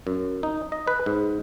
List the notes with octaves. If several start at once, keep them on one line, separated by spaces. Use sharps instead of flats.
F#2
D#4
D#5
B4
G#2